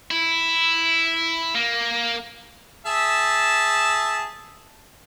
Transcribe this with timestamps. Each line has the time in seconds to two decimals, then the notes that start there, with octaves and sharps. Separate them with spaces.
0.11 E4
1.55 A#3
2.86 G#4 E5 A5